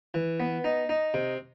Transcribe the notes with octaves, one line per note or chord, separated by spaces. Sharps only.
E3
B3
D#4
D#4
C3